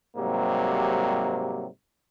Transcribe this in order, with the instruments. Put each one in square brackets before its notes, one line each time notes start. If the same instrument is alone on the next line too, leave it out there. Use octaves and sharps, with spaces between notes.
[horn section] G#2 C3 F#3 G3 A#3